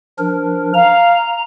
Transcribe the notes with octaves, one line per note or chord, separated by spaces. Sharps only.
F3 D4 A#4
F5 A#5